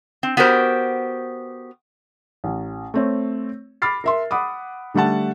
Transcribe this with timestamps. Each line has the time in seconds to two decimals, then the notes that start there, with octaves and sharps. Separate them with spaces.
0.23 C4
0.37 B3 F#4 G4 A#4 C5
2.44 A1
2.94 A3 C4 C#5
3.82 B5 D6 F6 A6 C7
4.04 A#4 E5 C6
4.31 F#5 B5 D6 D#6
4.94 D3 G3 A3 F#5 A5